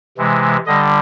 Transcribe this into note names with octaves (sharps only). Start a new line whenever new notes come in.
C3 E3 G#3
D3 G3 D#5